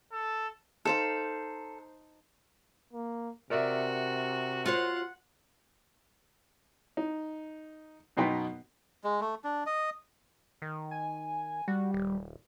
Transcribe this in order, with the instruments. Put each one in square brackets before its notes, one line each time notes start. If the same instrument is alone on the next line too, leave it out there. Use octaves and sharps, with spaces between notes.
[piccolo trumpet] A4
[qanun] D#4 C5 F5 [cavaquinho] A4
[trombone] A#3
[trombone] C3 [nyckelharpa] F#4 [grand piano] A#4 D5 E5
[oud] F4 F#4 C5 [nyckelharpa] F#5
[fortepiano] D#4
F#2 B2 B3 D#4 G5 C6
[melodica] G#3
A3
D4
D#5
[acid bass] D#3
[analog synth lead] G#5
[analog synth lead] G3 [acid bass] F#4
[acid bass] D#1